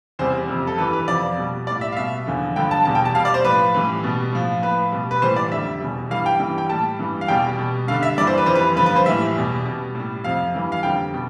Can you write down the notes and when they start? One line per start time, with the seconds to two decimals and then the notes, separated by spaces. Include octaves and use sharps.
0.19 E2 C3 G3 C5
0.48 F2 C3 G3
0.67 A4
0.78 G2 E3 G3 B4
0.93 B4
1.08 F2 C3 F3 D5
1.37 B2 G3
1.67 A2 G3 D5
1.81 E5
1.92 F5
1.96 B2 G3 E5
2.26 E2 D3 F3
2.56 G2 D3 F3 G5
2.71 A5
2.85 E2 B2 G3 A5
2.95 G5
3.05 A5
3.14 B2 G3 F5
3.25 D5
3.34 C5
3.44 A2 F3 B4
3.74 A2 E3 G3
4.04 B2 G3
4.33 A2 F3
4.62 A2 F3 B4
4.92 B2 G3
5.11 B4
5.22 A2 E3 G3 C5
5.36 D5
5.51 F2 D3 G3 E5
5.80 E2 B2 G3
6.10 G2 E3 G3 F5
6.26 G5
6.39 G2 E3 G3
6.58 G5
6.69 A2 G3 A5
6.99 G2 E3 G3
7.21 F5
7.28 E2 B2 G3 G5
7.58 B2 G3
7.87 G2 D3 G3 F5
8.03 E5
8.18 G2 E3 G3 D5
8.27 C5
8.38 B4
8.46 F2 E3 G3 C5
8.55 B4
8.76 G2 D3 F3 B4
8.86 B4
8.96 C5
9.06 A2 E3 G3 E5
9.36 E2 B2 G3
9.65 B2 G3
9.95 A2 G3
10.24 F2 C3 F3 F5
10.54 G2 E3 G3
10.72 F5
10.83 F2 D3 G3 G5
11.14 B2 G3